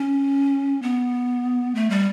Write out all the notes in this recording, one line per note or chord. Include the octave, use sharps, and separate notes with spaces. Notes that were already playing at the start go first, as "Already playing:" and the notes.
Already playing: C#4
B3
A3
G3